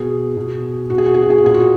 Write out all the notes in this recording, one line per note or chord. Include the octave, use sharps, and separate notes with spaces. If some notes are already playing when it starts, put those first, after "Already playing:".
Already playing: B2 G#4
B2
B2 F#4
G#4
F#4
G#4
F#4
G#4
F#4
A#2 G#4
F#4